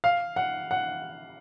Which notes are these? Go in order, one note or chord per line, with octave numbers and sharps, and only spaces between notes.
F5
F#5
F#5